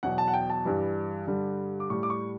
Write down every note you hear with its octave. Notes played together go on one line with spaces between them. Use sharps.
E2 B2 F#3 F#5
A5
F#5
G5
A5
G2 E3 G3
G2 D3 G3
D6
A2 G3 C#6
D6
C#6